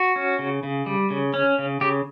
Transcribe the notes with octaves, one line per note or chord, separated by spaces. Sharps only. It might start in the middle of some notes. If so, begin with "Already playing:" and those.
Already playing: F#4
C#4
C#3
C#3
G3
C#3
C#4
C#3
C#3 G4